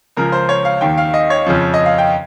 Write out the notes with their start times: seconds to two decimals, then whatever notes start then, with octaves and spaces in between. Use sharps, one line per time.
0.17 C#2 C#3 F3 A#4
0.32 C5
0.49 C#5
0.65 F5
0.81 D#2 D#3 G5
0.98 F5
1.14 D#5
1.30 C#5
1.47 F2 C#3 F3
1.74 D#5
1.86 F5
1.98 G5